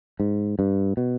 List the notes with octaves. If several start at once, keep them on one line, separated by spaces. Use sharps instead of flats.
G#2
G2
B2